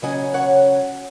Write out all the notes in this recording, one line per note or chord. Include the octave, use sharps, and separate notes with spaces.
C#3 F#3 C#4 D#5 G#5
C#5 F#5